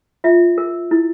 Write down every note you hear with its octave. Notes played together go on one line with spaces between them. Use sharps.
F4 E5
A#4
E4